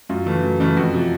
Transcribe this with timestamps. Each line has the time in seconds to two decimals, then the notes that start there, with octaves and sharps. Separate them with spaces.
0.09 F#2 F4
0.26 C#3 E3 A3
0.43 F#2
0.60 C#3 E3 A3
0.77 F2 F#4
0.94 C3 F3